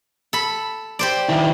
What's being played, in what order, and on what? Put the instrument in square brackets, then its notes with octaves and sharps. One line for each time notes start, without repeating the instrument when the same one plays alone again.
[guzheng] A4 B5
G4 C5 D5
[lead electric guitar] D#3 E4